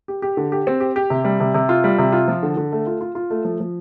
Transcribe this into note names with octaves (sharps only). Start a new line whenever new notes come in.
G4
G4
D3
G4
C4
G4
G4
C3
G3
C3
C3
F4
G3
C3
F4
F3
D3
D3
A3
F4
F4
F4
A3
F3
F3